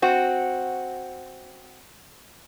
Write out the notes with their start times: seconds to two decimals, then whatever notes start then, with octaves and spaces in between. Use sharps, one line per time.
0.02 C4 F#4